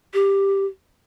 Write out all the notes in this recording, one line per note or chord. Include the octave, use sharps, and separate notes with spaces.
G4